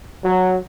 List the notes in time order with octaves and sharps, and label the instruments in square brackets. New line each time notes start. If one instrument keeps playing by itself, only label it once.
[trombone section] F#3